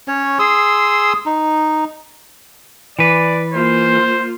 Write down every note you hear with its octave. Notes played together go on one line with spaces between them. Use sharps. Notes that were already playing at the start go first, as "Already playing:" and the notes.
C#4 C#5
G#4 C6 D#6 E6
D#4
E3 B4 D5
A#3 F4 C5